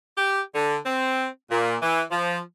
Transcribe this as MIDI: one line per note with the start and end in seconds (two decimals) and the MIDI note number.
0.18 0.40 67
0.55 0.78 50
0.86 1.27 60
1.51 1.76 46
1.82 2.03 52
2.12 2.40 53